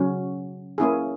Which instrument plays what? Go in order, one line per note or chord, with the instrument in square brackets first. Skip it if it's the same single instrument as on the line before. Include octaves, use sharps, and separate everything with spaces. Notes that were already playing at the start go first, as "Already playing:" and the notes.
Already playing: [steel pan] C#3 F#3 C#4
A#3 C#4 E4 G#4